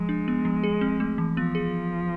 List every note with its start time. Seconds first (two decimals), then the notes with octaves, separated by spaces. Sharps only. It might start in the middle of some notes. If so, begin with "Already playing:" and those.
Already playing: F3 G#3
0.09 D4
0.28 B3
0.45 F3
0.64 G#4
0.81 C4
1.00 A3
1.18 E3
1.37 F3 B3
1.55 G#4